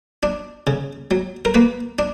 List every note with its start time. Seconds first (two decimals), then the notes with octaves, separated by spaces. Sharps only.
0.23 D4
0.67 C#3
1.11 F#3
1.45 A#4
1.54 A#3 B4
1.99 D4